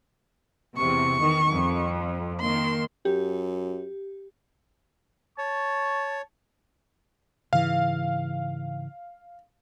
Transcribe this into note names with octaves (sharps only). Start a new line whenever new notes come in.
E2 C3 C#6
D#3
F2
D#3 A#3 C6
F#2 G4
C#5 A5 C#6
G#2 C#3 E3 F5